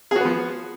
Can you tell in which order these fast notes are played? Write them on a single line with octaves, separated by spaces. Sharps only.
G#4 F#4 B3 F3